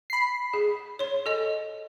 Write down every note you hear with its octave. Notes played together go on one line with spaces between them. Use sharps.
B5 C7
G#4
C#5 C6
A4 D#5